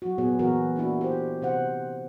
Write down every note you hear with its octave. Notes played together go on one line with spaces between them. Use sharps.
F#3 F#4
A#2 B3 G#4 C#5
A#2 E3 B3 F#4 G#4 A#4
A#3 D4 E4 F#4
G4 C5
C3 C4 G4 C5 F#5